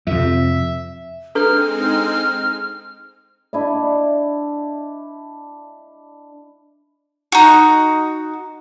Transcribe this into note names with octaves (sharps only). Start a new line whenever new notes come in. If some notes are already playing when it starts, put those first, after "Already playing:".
F2 C3 E5
G#3 C4 D4 D#4 A4 B4 F6
D4 E4 D#5
D#4 F#4